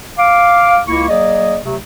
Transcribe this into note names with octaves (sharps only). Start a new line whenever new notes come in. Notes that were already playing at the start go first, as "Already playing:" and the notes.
F5 D6
C#2 A#3 E4 C#6
F#3 A#3 G#4 D5 D#5
C3 F#3 A3